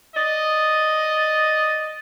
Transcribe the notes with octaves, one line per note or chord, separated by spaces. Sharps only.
D5 D#5